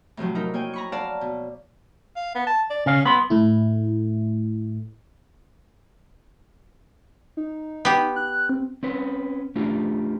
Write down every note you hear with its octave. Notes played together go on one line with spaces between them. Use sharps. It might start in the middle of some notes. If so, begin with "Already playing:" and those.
A2 C3 F3 F#3
D#4 E4 A#4
A#3 C#5 G5 G#5
A#5 B5 C#6
C#5 D5 F5 F#5 A5 A#5
B2
F5
B3
A5
D5
C#3 C#4 F5
B3 B5 C6
A2 A3 E4
D#4
B3 G4
F#6
C4
C4 C#4 B4
A3 D4 F4 G4